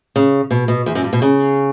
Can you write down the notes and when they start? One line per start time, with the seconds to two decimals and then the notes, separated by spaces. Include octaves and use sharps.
0.16 C#3
0.50 B2
0.68 B2
0.86 E2
0.95 F#2
1.04 G2
1.13 B2
1.22 C#3